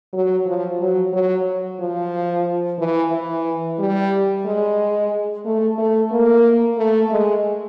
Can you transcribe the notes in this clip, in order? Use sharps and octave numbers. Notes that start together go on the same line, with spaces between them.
F#3
F3
F#3
F#3
F3
E3
E3
G3
G#3
A3
A3
A#3
A3
G#3